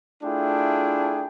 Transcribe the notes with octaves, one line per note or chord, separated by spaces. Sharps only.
A3 D4 E4 F4 G#4 G5